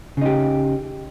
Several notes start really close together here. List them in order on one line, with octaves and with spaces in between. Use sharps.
C#3 D#4 G4